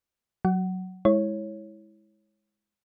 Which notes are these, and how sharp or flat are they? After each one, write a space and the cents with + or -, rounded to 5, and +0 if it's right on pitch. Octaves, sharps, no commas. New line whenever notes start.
F#3 +0 F#5 +20
G#3 +0 E4 -10 C#5 -15